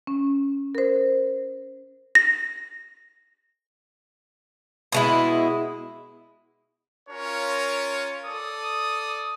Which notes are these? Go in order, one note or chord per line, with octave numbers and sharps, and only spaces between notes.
C#4
A#4 C5
A#6
B2 G#3 E4
C#4 F4 A#4 C#5
A4 D5 D#6